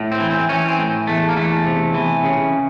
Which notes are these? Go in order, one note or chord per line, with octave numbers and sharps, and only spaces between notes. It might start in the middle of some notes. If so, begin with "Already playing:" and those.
Already playing: A2
C4
E3
C4
E3 C#4
C4
A2
E2 A3
A#3
E2 A3
C3
E3
C#3